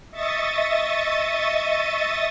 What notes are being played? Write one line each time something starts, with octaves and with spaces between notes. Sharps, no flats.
D#5 E5 C#6 D#6 A6